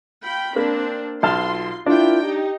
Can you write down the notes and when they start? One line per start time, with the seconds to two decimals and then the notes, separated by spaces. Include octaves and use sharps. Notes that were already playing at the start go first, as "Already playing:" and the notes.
0.24 F4 G5 B5
0.56 A#3 C4 D4
1.23 B1 F4 A5 C6 F6
1.86 D4 E4 F4 A#4 G5
2.23 D#4 G4